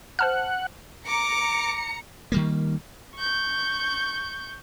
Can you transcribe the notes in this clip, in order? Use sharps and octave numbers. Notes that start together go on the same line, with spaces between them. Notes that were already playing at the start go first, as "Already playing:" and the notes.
C5 F#5 A5 F6
A#5 D6 C#7
D#3 G3 A#3
C#6 G6